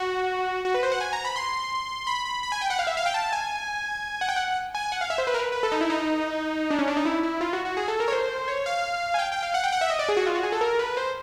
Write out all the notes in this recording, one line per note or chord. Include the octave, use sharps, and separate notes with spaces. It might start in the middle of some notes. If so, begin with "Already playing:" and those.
Already playing: F#4
F#4
B4
C5
F#5
G#5
A#5
B5
C6
B5
B5
B5
G#5
G5
F#5
F5
E5
F5
G5
A5
G#5
F#5
G5
F#5
G#5
F#5
F5
E5
C5
B4
A#4
B4
B4
A4
D#4
E4
D#4
D4
C#4
D4
D#4
E4
E4
F4
F#4
F#4
G#4
A4
A#4
C#5
C5
C#5
F5
G#5
G5
G5
F5
F#5
G5
F#5
E5
D#5
D5
G#4
F#4
F4
F#4
G#4
A4
A#4
B4
C5